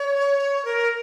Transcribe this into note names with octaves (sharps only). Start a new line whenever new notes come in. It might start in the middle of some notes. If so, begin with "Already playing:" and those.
Already playing: C#5
A#4